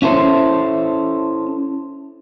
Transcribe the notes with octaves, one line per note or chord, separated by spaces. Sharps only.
C#4 E4 A4 C5